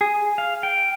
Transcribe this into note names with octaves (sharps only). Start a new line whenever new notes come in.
G#4
F5
G5